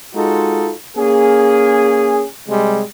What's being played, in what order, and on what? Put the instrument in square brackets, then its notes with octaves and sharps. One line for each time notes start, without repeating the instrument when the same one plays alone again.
[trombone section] G#3 D#4 F4 F#4 A4
A#3 C#4 G#4
C3 G3 G#3